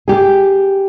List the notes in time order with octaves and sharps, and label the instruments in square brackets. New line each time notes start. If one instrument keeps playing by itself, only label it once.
[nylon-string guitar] G4 G#4